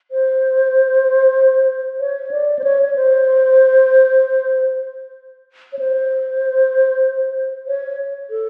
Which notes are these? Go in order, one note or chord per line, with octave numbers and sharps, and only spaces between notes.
C5
C#5
D5
C5
C#5
C#5
C5
C#5
C5
C#5
A4